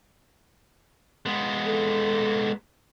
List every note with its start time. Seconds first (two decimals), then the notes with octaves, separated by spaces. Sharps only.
1.26 G#3 B3
1.65 A4